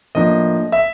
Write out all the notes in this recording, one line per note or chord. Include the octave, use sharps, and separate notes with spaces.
A2 F3 A#3 D4 D#5
E5